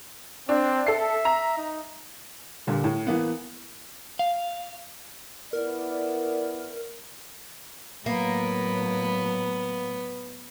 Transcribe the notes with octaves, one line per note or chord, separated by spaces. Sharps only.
C4 D4
A4 E5 C7
A#5
D#4
A#2 D3 G3
A2
E3 A#3 B3
F5
B3 E4 A#4 D5
A2 F#3 A#3 B3